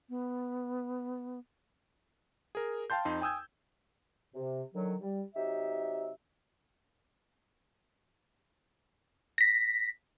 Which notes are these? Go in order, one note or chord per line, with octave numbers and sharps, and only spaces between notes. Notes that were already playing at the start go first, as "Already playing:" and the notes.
B3
G#4 A#4
F5 G5 A5 C6 G6
F2 D#4 C6
G5 G#5 D#6 E6 G6 G#6
C3
D3 D#3 F#3
G3
C3 F#3 D#4 G4 E5
A#6 B6